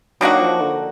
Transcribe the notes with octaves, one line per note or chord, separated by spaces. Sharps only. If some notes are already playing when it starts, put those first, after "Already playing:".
D#3 F#3 A#3 D4 F#4
F3
D3